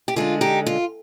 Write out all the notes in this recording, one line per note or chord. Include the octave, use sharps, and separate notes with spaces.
G4
D3 G#3 D4 F4
D#4 G4
F4